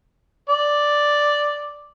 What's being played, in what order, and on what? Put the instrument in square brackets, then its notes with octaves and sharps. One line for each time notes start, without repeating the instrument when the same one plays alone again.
[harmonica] D5